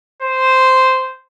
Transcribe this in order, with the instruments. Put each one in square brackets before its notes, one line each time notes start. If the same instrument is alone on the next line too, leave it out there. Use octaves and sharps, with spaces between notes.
[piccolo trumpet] C5